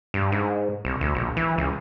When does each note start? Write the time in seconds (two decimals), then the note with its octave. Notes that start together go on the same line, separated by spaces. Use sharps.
0.14 G2
0.32 G#2
0.85 C2
1.01 D2
1.15 A#1
1.37 E3
1.58 C#2